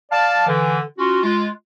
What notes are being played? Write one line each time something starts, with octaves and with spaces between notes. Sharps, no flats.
D5 F5 A5
D3 E3
C#4 F4 F#4
G#3 F4